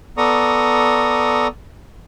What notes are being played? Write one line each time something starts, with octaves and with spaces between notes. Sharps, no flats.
B3 A4 D5 A#5 C#6 D#6